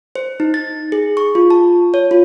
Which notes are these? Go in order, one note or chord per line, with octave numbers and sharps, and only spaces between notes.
C5
D#4
A6
G#4
C#6
F4
A5
C#5
F4